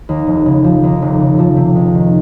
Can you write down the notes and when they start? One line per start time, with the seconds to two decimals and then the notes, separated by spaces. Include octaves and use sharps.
0.09 D#2
0.27 F1
0.46 C#3
0.64 F3
0.83 D#2
1.02 F1
1.20 C#3
1.39 F3
1.57 C3
1.75 C#2
1.94 D#3